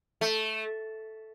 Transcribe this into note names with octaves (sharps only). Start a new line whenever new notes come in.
A3